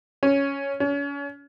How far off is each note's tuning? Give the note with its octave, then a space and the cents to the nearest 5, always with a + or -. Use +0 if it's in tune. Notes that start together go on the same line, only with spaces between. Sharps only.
C#4 +5
C#4 +35